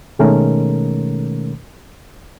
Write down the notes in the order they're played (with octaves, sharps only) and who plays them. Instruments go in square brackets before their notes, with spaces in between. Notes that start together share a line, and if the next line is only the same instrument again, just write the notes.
[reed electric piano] B2 D#3 G#3 A3 C#4 A#4